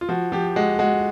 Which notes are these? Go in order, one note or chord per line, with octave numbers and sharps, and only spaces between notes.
F4
F3 F#4
F3 G4
G#3 F#4
G#3 F#4